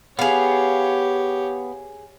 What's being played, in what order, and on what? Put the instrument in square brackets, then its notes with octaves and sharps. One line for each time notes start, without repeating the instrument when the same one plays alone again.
[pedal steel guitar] B3 [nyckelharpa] G4 C#5 [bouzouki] G#4 F5